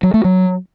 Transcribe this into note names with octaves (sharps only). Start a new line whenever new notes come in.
F#3
A3
F#3